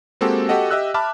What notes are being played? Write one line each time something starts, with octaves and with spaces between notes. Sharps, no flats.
G#3 A#3 C4 F#4 G4 A4
F#4 G4 A4 D#5 F#5
G4 D#5 E5 E6 F#6
E5 A5 B5 D6 F6